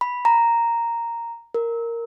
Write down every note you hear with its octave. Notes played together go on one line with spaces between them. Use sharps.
B5
A#5
A#4